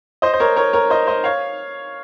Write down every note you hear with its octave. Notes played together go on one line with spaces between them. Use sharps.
C5 D#5
C5
A#4 C#5
A#4 C#5
A#4 C#5
C5 D#5
C5 D#5
C#5 F5